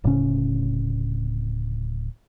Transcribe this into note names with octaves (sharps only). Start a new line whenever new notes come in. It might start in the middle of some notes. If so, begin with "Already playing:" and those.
D1 A2 C#3 C#4